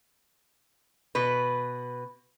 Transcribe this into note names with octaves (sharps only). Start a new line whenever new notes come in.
B2 B4